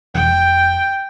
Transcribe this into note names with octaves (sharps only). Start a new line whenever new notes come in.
F1 G5